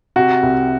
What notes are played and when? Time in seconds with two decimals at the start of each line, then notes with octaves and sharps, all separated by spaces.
0.16 C3 F#4
0.43 C2